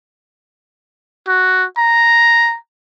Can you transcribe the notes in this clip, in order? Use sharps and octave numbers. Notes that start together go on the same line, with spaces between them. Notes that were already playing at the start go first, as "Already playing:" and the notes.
F#4
A#5